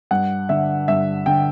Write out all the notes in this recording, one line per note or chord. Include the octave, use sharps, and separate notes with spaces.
G2 F#5
D3 E5
G2 E5
D3 G5